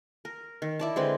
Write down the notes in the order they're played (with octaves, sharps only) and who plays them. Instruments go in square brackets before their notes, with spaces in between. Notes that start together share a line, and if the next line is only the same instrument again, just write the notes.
[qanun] A#4
D#3
E4 D5 A5
D3 G#3 C4 B4